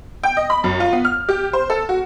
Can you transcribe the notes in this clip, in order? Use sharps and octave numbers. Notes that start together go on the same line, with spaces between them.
G5
D#5
B5
F#2
F4
B3
F6
G4
C5
A4
F#4